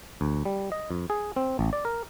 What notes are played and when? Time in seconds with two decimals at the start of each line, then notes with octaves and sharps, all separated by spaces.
0.21 D2
0.45 G3
0.72 D#5
0.91 F2
1.10 G#4
1.36 C4
1.59 A1
1.73 D5
1.85 A#4